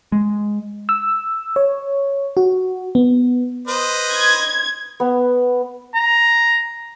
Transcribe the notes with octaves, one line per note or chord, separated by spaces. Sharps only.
G#3
E6
C#5
F#4
B3
B4 C5 D#5
G#6
B3
A#5